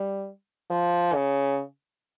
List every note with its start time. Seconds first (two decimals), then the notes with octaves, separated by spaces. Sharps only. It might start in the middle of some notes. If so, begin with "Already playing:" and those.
Already playing: G3
0.70 F3
1.14 C#3